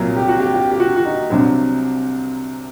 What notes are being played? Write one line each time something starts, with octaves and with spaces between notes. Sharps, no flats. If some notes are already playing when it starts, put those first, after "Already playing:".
Already playing: C2 A#2 F#3 A#4
G4
F#4
G4
G4
G4
F#4
F#4
D#4
C2 C3 F#3 D4